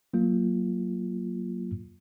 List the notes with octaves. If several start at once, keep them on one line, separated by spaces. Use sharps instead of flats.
F#3 A#3 F4